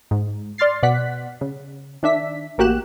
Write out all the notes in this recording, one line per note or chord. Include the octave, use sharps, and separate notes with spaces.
G#2
D5 C6 F6 A6 C7
B2 D5 F#5 F#6 B6
C#3
D#3 D4 E5 B6
A1 A#3 F#4 G4 F#6 E7